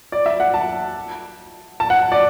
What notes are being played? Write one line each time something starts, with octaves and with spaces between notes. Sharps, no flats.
D5
E5
F#5
A5
A5
F#5
D5